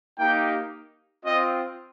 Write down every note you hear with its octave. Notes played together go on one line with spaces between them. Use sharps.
A#3 D#4 G4 G5
C4 F4 D#5